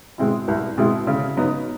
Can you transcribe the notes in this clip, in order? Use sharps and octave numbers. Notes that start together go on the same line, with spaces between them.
B2 G#3 C4 E4
C2
B2 G#3 C4 E4
C#3
F#3 B3 D#4